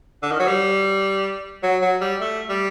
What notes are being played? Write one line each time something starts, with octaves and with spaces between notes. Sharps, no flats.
D3
D#3
F#3
G3
F#3
F#3
G3
A3
G3